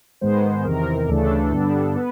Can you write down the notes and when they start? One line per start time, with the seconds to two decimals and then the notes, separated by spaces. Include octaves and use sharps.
0.21 G#2 D#3 G#3 B3 C5
0.64 E2 C3 D#3 A#4
1.09 D2 C#3 E3 A3 D4 A4
1.52 G2 D3 G3 B3 D4
1.95 B3 B4